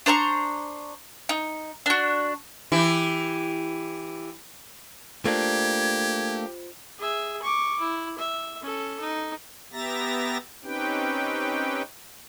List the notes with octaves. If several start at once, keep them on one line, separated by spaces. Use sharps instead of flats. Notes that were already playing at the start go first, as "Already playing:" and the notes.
D4 C5 A#5 C#6
D#4
D4 F#4
E3 E4 G4
A3 A#3 D4 F4 G4 C5 G#6
G#4 E5
C#6 D6
E4
E5
C#4 A4
D#4
B3 G4 E5 A#5 A6 A#6
C4 C#4 D#4 G4 B4 G5